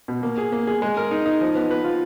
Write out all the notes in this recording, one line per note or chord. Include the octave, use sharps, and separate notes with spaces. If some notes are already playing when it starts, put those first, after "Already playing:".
B2
A#3
G#4
A#3
G#4
G#3
A#4
D#4
D#4
F3
B3
B4
F4